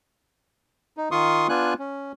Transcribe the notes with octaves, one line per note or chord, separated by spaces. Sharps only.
D#4
D#3 F4 C6 C#6 D#6
B3 D4 F4 G#5 F#6
C#4